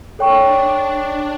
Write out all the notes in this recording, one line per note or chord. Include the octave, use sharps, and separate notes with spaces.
D4 A4 C#5 G5 C#6
D4